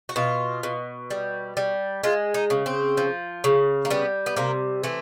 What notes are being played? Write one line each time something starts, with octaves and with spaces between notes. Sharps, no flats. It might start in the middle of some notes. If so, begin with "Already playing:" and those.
F#4
B2 F4
B2
G3
G3
G#3 F4
D#4
C#3
C4
F3
C#3
A#3
G3 B3
B3
C3 A#3
E3 A3